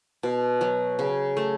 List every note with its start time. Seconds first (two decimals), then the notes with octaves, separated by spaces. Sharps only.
0.23 B2
0.61 F#3
0.99 C#3
1.37 A3